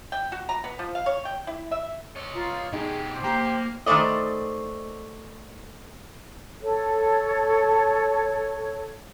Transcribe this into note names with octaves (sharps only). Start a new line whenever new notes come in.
G5
F#4
A#5
B3
F3
F5
C#5
G5
E4
E5
C#5 D#5
F4 A#5 D#6
B2 D#4 G4 G#4
C5 D6
A#3 G4 A#5
D#3 A3 C#4 C5 D5 D#5
A4 C#5